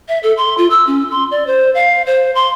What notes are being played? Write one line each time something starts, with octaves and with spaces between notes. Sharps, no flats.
E5
A4
C6
F4
E6
C#4
C6
D5
C5
F5
C5
C6